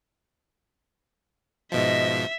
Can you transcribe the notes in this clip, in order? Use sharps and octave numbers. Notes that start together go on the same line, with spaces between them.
G#2 B2 F3 D#5 E5